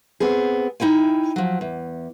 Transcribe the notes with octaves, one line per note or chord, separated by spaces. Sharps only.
B3 C4 G#4
D#4 E4 G5 G#5
F3 F#3
E2